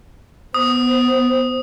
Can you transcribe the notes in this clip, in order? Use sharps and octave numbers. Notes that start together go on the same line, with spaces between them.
B3 C5 D#6